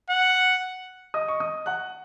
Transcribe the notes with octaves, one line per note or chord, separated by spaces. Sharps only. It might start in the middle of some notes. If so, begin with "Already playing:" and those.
F#5
D#5 D#6
C#6
D#5 D#6
F#5 F#6